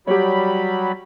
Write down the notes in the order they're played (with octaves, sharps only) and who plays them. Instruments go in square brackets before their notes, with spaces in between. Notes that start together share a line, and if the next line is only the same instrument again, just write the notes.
[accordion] F#3 G3 B5 [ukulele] G4 C#5